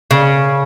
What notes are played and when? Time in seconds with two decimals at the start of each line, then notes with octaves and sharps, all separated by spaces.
0.11 C#3